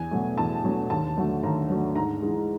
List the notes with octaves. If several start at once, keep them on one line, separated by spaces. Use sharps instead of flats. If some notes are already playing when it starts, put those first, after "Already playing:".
Already playing: E2 G#5
B2 F#3 A3
E2 A5
B2 F#3 A3
D#2 A5
D3 F#3 A3
D#2 A#5
D3 F#3 A3
G#2 A#5
E3 G#3